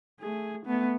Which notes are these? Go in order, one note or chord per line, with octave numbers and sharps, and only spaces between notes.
A3 G#4
A3 B3